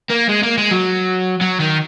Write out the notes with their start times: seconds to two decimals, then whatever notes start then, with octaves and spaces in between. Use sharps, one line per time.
0.10 A#3
0.29 G#3
0.43 A#3
0.58 G#3
0.71 F#3
1.41 F#3
1.60 D#3